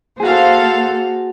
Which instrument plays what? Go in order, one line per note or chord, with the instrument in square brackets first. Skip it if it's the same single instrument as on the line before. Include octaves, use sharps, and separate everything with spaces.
[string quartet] A#3 A4 [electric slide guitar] F#4 G#4 [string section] C5 F5